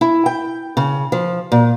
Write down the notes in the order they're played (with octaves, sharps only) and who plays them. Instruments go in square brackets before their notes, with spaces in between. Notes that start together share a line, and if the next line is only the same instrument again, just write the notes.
[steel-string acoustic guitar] E4
G5
C#3
F3
A#2